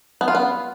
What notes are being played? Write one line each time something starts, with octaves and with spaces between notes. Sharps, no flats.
B3
F4
B3